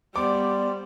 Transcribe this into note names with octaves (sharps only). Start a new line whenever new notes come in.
G3 B3 C5 D5 D6